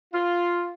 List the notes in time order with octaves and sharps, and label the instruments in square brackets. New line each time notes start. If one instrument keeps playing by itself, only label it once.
[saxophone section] F4